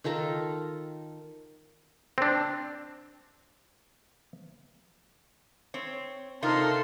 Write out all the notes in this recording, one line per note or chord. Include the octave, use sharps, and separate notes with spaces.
D#3 F4 A4 A#5
C4 D4
C4 C#5
C3 D#4 F4 A4 A#4 C6